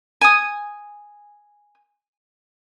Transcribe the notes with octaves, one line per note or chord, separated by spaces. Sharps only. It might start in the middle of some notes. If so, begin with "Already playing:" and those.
G#5 D#6